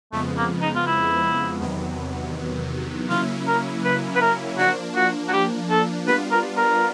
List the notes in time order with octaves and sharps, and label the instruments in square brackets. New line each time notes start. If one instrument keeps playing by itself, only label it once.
[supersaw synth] F2 C#3 F3 G#3 B3 [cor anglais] A3
[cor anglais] A#3
D#4
F4
E4
[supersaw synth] E2 C3 D#3 F#3 B3
[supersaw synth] C#3 F#3 A#3 C#4 E4 [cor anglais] F4
[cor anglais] A#4
B4
B4
A#4
[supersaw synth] F3 A#3 D4 [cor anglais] F#4
[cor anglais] F#4
F#4
G4
A4
[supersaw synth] G3 B3 D4 F4 [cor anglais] B4
[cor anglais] A#4
A#4